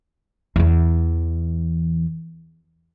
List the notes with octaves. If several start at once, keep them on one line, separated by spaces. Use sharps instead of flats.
E2 E3